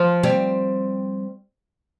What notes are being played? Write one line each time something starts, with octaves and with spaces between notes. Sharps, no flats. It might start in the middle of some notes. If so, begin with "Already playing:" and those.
Already playing: F3
G3 C4